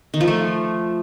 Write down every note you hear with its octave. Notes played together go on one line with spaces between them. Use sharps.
D#3
F3
A3